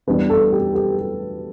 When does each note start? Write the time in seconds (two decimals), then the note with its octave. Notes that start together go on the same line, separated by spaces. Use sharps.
0.07 E2 E3 G3 D4 B4
0.30 A4
0.52 G4
0.75 G4
0.98 G4